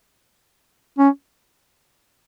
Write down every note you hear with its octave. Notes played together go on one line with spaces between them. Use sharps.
C#4